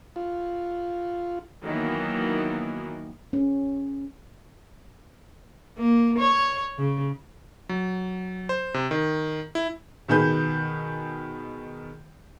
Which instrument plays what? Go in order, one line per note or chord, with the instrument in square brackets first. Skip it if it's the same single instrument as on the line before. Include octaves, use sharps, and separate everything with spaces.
[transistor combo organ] F4
[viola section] D#3 E3 F#3 A#3 B3
[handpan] C#4
[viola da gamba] A#3
C#5
C#3
[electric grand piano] F#3
C5
C3
D#3
E4
[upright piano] B2 D#3 G#4 B4 G6